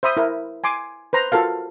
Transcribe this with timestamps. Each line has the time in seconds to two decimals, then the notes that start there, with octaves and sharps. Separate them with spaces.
0.03 C5 E5 B5 D#6
0.17 E4 A#4
0.64 G#5 C6 D6
1.13 B4 C5 A#5 C6
1.32 F4 F#4 A4 A#4 F5